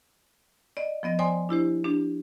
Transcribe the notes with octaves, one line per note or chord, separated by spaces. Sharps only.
D5 D#5
F3 B3 D#5 A#6
C5 D5 G5 G#5 C6 D#6
D4 E4 G4 C5
D4 G4